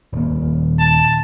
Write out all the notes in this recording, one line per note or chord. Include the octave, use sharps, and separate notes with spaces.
D#1 A#3
A5